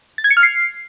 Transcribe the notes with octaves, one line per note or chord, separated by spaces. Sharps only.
A6
G#6
C#7
F6
C7